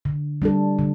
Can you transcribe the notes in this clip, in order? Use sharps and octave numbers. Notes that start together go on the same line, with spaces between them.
D3
G3 D4 A4
D3